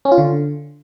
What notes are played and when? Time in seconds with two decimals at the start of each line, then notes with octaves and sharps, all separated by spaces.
0.05 C#4
0.12 F4
0.18 D3